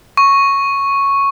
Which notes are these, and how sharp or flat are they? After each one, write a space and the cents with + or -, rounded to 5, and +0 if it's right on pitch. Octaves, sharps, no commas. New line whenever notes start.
C#6 -5